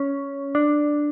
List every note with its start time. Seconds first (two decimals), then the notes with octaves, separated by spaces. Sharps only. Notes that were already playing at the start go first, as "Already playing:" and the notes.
Already playing: C#4
0.55 D4